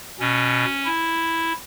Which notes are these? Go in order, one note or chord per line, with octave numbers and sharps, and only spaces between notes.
B2 C#4
E4